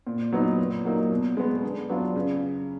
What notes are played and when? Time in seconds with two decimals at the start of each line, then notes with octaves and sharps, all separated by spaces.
0.07 A#2
0.33 F#3 B3 D#4
0.59 A#2
0.85 F#3 A#3 D#4
1.11 B2
1.37 G#3 B3
1.63 D3
1.90 F#3 B3 D4 F4
2.16 C#3